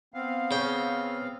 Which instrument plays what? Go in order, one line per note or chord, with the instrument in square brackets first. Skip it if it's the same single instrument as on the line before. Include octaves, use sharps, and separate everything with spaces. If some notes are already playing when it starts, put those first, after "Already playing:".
[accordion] B3 C4 F5
[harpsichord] C#3 G5